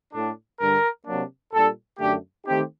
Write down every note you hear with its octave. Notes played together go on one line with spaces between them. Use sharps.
A2 A3 D4
G2 D3 G3 D4 A#4
C3 F#3 A#3 D4
A#2 G3 D4 A4
F#2 D3 A3 D4 G4
D#3 A3 C4 D#4 G4